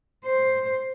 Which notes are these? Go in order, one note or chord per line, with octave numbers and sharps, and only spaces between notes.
C5